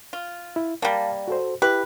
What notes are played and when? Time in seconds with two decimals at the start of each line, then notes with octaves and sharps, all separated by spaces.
0.13 F4
0.56 E4
0.82 G3 A#3 F5 A5
1.28 F#4 A4 C5
1.62 E4 G4 B4